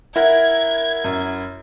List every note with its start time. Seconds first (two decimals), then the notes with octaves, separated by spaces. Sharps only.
0.16 E4 A#4 E5 F#5 G#6
1.04 F#2